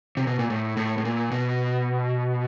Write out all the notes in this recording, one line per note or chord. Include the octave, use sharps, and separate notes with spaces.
C3
B2
A#2
A2
A2
A2
A#2
B2